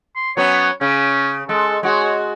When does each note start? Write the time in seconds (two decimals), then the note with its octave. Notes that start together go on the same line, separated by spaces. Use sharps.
0.16 C6
0.37 F#3 B3 C#4 C#5
0.81 C#3 C#4
1.49 G#3 A4
1.83 G#3 F#4 C#5